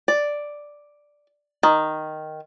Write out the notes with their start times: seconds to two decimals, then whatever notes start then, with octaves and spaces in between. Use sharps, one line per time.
0.08 D5
1.63 D#3